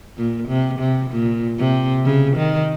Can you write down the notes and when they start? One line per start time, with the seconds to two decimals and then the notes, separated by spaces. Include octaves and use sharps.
0.17 A#2
0.49 C3
0.80 C3
1.11 A#2
1.58 C3
2.05 C#3
2.36 D#3